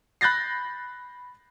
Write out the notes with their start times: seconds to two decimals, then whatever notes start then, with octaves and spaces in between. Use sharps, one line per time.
0.21 B5 F#6 G6 A6 A#6 C7